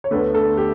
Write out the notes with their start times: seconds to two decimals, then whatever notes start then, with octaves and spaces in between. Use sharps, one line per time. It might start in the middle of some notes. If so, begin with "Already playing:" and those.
0.04 C#5
0.11 D2 D3 A3 B3 B4
0.34 A4
0.57 G4